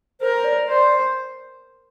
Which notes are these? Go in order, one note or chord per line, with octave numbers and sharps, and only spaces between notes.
A#4 C5
D5
C5 D5